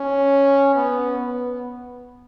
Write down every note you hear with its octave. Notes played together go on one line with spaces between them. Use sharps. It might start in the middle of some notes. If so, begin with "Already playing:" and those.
Already playing: C#4
B3
B3